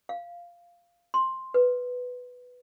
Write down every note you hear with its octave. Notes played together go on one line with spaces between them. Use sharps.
F5
C6
B4